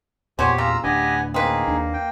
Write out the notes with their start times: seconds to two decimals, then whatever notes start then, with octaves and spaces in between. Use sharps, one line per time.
0.39 E2 A#2 F#3 G4 C5 C#5 G#5
0.58 C#3 F4 A#5 E6
0.84 D1 D4 G4 B4 D#5 F#5 G#5
1.34 A#3 C4 D#4 G#4 B4
1.68 D#2 D4
1.94 G5